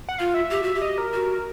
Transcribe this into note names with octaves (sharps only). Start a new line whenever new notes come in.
F#5
F4 F5
E5
G4
F#4
G4
D#5
A#4
F#4